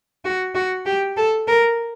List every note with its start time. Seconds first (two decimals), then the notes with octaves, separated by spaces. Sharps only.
0.25 F#4
0.55 F#4
0.86 G4
1.17 A4
1.48 A#4